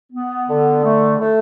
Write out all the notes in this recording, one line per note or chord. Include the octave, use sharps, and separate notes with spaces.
B3
D3
A3
A3